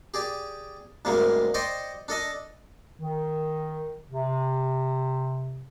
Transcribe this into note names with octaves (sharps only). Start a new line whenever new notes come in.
G4 G#4 D5
D2 G#2 C3 G3 G#3 A#3
C5 D5 D#5 G5 C6 C#6
D4 A4 D#5 A5
D#3
C3